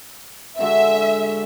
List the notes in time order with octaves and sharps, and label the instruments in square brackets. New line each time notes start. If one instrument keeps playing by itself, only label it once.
[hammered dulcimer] D3 G#3 F#4 [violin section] E5